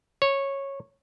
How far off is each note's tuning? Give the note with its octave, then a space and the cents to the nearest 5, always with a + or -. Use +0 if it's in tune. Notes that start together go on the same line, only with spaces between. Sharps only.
C#5 -10